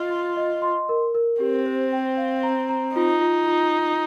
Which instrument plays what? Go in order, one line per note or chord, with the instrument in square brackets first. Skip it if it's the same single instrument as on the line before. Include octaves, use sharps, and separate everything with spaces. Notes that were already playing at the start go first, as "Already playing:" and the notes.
Already playing: [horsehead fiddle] F4 [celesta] D#5
[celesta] C6
D#5
C6
A#4
A#4
[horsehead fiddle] C4 [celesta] G4
[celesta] C5
G5
F5
A#5
A#5
[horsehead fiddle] D#4 [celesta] F4
[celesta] F4
F4
F4